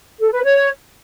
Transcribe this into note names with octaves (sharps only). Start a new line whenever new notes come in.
A4
B4
C#5